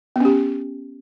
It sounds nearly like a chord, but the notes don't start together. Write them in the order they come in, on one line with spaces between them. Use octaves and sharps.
B3 C#4 G4